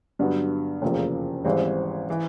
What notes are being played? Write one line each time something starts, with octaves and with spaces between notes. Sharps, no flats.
G2 D3 F#3 B3
F1 E2 C#3 F3 A#3
G#1 G#2 E3 G3 C4
E3